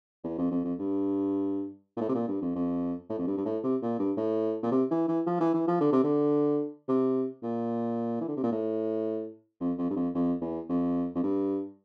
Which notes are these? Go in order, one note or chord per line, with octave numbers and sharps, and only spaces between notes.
E2
F2
F2
F2
G2
A#2
A2
C3
A#2
G2
F2
F2
A2
F2
G2
G2
A2
C3
A#2
G2
A2
A#2
C3
E3
E3
F3
E3
E3
F3
D3
C3
D3
C3
A#2
E3
D3
C3
A#2
A2
F2
F2
G2
F2
F2
E2
F2
F2
G2